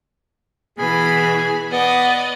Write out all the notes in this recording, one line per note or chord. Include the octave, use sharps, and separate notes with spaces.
B2 E3 G#4 B5
B3 D5 D#5 F#5